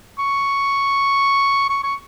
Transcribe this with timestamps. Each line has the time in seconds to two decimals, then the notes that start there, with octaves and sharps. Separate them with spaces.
0.19 C#6
1.70 C#6
1.84 C#6